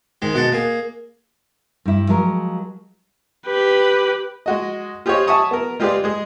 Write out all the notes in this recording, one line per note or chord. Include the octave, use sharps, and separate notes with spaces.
G#2 D#3 G#3
B2 G#3 F#5 A5
A#3 G#4
G2 E4
F3 F#3 G#3 A#4
G4 B4
G#3 F#4 D#5
F4 G4 G#4 C5 C#5 D#5
E5 F#5 G#5 A5 C#6 D#6
B3 A#4
G#3 F4 G4 G#4 B4 D5
G#3 G#4